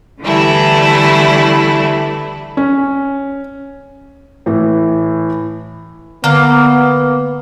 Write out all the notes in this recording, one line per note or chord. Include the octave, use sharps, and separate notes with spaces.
D3 E3 G3 A3 E4
C#4
A2 E3
D3 A#3 B3